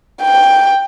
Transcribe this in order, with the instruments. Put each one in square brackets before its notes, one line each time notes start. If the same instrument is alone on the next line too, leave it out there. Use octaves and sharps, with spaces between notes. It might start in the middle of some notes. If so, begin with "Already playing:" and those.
[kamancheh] G5